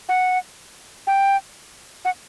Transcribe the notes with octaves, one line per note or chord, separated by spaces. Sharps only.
F#5
G5
F#5